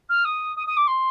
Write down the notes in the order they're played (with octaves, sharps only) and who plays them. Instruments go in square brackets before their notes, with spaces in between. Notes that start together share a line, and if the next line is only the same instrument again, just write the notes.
[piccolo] F6
D#6
D#6
D#6
D6
C6